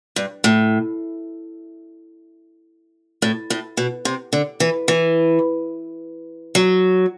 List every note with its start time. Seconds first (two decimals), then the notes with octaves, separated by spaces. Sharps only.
0.16 G2
0.44 A2
3.22 A2
3.50 A2
3.77 B2
4.05 C3
4.33 D3
4.60 E3
4.88 E3
6.55 F#3